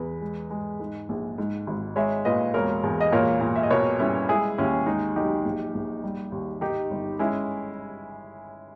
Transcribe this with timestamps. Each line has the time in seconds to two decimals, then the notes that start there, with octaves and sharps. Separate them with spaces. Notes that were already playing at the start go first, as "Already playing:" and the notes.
Already playing: E2 B4
0.21 G#3
0.50 G#3
0.80 G#2
1.09 A#1
1.38 G#2
1.67 G#1
1.96 G#3 C#5 E5
2.25 A#2 B4 D#5
2.54 E1 A#4 C#5
2.83 E2
3.01 D#5
3.12 A#2 A#4 C#5
3.41 A#2
3.56 E5
3.63 D#5
3.70 B2 A#4 C#5
3.99 G3 C#4 E4
4.28 G#3 E4 G#4
4.58 D#2 C#4 E4
4.86 G#3 D#4
5.16 B1 D#4 G4
5.45 A#1
5.75 A#1
6.04 G3
6.32 D#2
6.61 D#3 D#4 G4
6.91 G1
7.19 G#3 C#4 E4